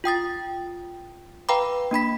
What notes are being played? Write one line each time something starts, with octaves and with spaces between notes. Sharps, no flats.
F4 G5 D#6 A6
B4 F5 G5 A#5 B5 D6
A#3 D4 B5 B6